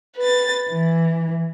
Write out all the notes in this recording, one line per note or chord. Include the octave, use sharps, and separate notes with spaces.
B4 A6
E3